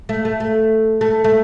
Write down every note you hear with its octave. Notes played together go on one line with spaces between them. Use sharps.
A3
A3
A3
A3
A3